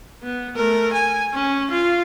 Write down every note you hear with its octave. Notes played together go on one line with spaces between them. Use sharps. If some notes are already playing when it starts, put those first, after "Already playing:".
B3
A3 A#4
G#5
C#4
F4 F5